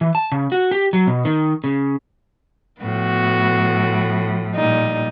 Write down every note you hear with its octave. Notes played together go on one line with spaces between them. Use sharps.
E3
A5
C#3
F#4
G4
F#3
B2
D#3
C#3
A2 F3 B3 F#4
A#2 G3 D#4